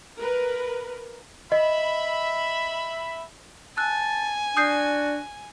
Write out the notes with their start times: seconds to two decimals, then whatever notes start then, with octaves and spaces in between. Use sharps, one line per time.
0.18 A#4 B4
1.52 D#5 E5 B5
3.77 G#5 A5 E6 F#6
4.57 D4 F#4 D#6 G6 C7